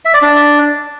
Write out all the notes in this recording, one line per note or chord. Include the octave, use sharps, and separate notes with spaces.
E5
D5
D4